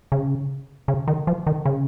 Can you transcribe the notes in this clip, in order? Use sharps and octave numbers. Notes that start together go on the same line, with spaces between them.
C#3
C#3
D#3
F3
D#3
C#3